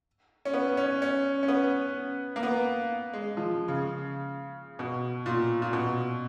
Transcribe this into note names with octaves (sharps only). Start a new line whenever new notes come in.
C#4
B3
C#4
C#4
C#4
B3
A#3
B3
G#3
F3
C#3
B2
A#2
A#2
B2